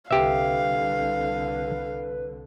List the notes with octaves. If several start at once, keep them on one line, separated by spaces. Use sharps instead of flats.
C2 D3 G4 B4 E5 F5